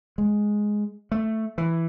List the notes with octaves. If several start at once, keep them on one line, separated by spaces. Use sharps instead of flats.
G#3
A3
E3